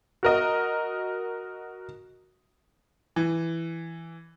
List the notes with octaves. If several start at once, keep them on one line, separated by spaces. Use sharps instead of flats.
F#4 A#4 D#5
E3